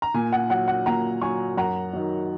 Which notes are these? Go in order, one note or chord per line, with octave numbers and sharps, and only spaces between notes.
A#5
A#2 G#5
F#5
F#3 F#5
F#5
A#2 F#5 A#5
F#3 G#5 C#6
F#2 F#5 A#5
D#3 F#3